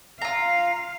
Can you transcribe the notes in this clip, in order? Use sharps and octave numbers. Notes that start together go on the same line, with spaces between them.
F4 F5 A#5